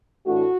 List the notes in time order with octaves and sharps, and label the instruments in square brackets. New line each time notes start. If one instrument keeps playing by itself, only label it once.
[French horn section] A2 E3 A3 D4 F#4